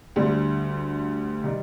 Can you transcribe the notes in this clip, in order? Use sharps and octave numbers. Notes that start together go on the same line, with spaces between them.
D2 D3 G3
D#3 G3